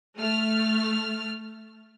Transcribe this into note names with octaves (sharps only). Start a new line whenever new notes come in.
A3 F6